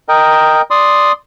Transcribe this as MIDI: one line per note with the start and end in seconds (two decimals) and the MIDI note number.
0.09 0.62 70
0.09 0.62 75
0.09 0.62 79
0.70 1.12 74
0.70 1.12 84
0.70 1.12 87